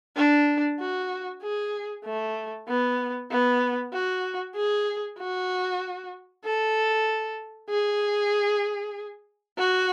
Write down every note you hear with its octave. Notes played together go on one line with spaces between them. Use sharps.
D4
F#4
G#4
A3
B3
B3
F#4
G#4
F#4
A4
G#4
F#4